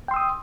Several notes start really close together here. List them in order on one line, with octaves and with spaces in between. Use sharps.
G5 C6 E6 D#6